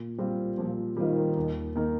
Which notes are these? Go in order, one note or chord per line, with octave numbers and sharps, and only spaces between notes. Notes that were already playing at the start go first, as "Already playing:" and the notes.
Already playing: A#2
G3 C4 F4
A#2 F3
D#3 G3 C4 F4
D#2
D#3 A#3 D#4 A#4